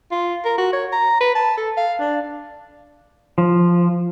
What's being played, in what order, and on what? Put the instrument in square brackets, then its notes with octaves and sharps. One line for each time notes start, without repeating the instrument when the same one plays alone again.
[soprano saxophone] F4
A#4
F#4
C#5
A#5
B4
A5
A4
F5
D4
[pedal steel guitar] F3